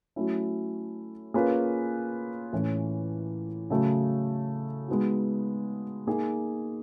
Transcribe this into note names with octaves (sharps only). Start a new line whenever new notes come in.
F#3 A3 C#4 E4
A#3 C#4 F4 G#4 B4
A2 E3 A3 C#4
C#3 F#3 A3
G#3 B3 D#4 F#4
A#3 D#4 G#4